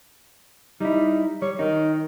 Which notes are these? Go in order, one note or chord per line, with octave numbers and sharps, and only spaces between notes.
G3 D#4 E4
G3 C#5
D#3 D#4